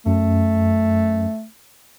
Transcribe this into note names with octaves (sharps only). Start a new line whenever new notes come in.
F#2 A3